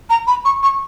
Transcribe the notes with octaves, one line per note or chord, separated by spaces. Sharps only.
A#5
B5
C#6
C#6